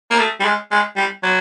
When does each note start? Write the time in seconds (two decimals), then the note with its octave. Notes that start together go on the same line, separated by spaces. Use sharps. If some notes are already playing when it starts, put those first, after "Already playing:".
0.10 A#3
0.19 A3
0.40 G3
0.45 G#3
0.71 G#3
0.96 G3
1.23 F#3